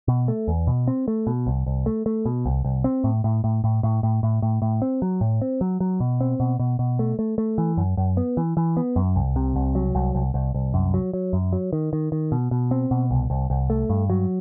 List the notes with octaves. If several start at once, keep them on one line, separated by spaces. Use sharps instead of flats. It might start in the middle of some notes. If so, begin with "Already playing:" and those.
B2
A3
E2
B2
C4
A3
B2
C2
C2
A3
A3
B2
C2
C2
C4
A2
A2
A2
A2
A2
A2
A2
A2
A2
C4
F#3
A2
C4
F#3
F#3
B2
C4
B2
B2
B2
A3
A3
A3
E3
F#2
F#2
B3
E3
E3
B3
F#2
C2
C3
C2
F#3
C2
C2
C2
C2
F#2
F#3
F#3
F#2
F#3
D#3
D#3
D#3
B2
B2
C4
B2
C2
C2
C2
A3
G2
F#3